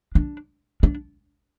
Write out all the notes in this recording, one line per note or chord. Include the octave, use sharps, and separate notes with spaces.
D4
D4